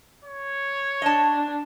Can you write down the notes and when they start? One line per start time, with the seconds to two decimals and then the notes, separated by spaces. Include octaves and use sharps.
0.24 C#5
1.02 D4 D#5 A5